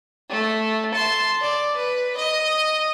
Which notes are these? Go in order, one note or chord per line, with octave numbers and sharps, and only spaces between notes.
A3
A5 C6
D5
B4
D#5